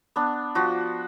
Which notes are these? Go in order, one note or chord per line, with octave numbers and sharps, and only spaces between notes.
B3 D4
F3 F#4